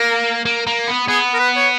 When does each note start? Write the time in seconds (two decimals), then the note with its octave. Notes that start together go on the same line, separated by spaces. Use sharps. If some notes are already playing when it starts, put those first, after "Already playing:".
Already playing: A#3 A#4
0.46 A#3
0.67 A#3
0.88 B3
1.08 B3 G#4
1.34 A#4
1.39 B4
1.56 C#5